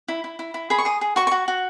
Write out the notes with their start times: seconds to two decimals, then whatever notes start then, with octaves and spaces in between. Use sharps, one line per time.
0.08 E4
0.24 E4
0.39 E4
0.54 E4
0.70 G#4 B5
0.78 C#6
0.85 G#4 D#6
1.01 G#4
1.16 F#4 C#6
1.27 C#6
1.32 F#4
1.48 F#4